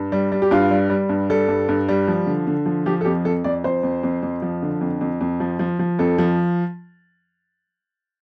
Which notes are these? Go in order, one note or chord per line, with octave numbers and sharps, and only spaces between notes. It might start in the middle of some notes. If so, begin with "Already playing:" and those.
Already playing: G2
G3
G3
G4
G2 F4
G3
G3
G2
G3 A4
G2
G2
G3
F3
D3
D3
F3
F3 G4
A4
F2 G4
F2 A4
F2 D5
F2 C5
F2
F2
F2
F3
D3
F2
F2
F2
F3
F3
F3
F2 A4
F3